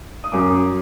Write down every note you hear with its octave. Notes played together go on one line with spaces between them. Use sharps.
D#6
F#2 D6